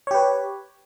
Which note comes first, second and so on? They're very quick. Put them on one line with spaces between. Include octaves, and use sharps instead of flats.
C#5 G4 B4